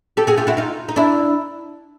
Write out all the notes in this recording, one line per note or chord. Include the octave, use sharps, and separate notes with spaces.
G4 A4
F#4 G#4
F4 G4
E4 F#4
D#4 F4
D#4
D4 E4